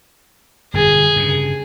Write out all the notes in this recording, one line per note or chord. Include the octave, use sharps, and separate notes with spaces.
G1 F2 B2 G#4
G2 C#3